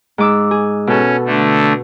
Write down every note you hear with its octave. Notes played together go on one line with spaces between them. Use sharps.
G#2 D6 E6
G#4
B2 C#4 A4
D3 A3